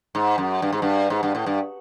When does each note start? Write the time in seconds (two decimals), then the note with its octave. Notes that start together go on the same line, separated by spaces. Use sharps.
0.15 G#2
0.38 F#2
0.62 G2
0.73 G#2
0.82 G2
1.10 G#2
1.23 G2
1.35 A2
1.46 G2